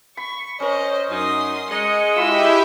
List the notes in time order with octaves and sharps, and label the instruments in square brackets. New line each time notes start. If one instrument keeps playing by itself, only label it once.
[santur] B5 [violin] C#6
[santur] C#4 A#4 [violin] C5 D#5
[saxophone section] F#2 D#4 [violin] C6 D#6
[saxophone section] G#3 D#5 [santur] A#5 [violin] C#7
[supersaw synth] E4 G4 E5 [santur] F4 B5 [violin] E6